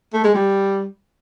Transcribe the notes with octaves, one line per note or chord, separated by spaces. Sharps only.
A3
G#3
G3